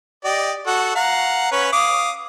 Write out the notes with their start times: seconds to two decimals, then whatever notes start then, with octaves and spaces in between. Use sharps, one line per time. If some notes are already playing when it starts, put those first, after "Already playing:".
0.25 G4 D5 D#5
0.67 F#4 A4 F#5
0.95 F5 F#5 A#5
1.51 C#4 B4 C#5
1.72 F5 D6 D#6